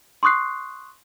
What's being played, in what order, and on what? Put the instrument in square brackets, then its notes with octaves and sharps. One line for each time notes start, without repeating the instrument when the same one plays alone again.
[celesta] C6 C#6 D#6 F#6 C7